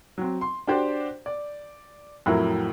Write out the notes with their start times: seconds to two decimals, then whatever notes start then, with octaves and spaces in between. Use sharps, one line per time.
0.18 F#3 C4
0.41 C6
0.67 D4 F#4 G4 C5 D5
1.26 D5
2.26 F2 A2 F#3 E4 A#4